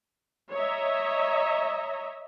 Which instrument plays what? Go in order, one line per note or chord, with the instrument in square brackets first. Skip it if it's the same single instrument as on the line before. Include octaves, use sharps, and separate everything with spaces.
[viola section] C#5 D#5 E5 A#5